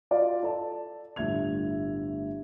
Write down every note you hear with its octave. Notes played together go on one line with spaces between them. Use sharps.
F4 F#4 D5 D#5 F5
A4 D5 A5
G1 A2 E5 G#6 F7